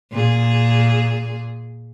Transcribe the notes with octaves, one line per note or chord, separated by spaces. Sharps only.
A#2 G#4